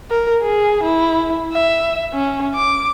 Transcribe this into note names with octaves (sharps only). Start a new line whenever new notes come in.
A#4
G#4
E4
E5
C#4
D6